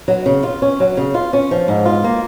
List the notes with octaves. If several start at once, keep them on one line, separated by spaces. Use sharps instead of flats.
F#3
C#3
F4
C#4
F#3
C#3
F4
C#4
F3
G#2
F4
A#3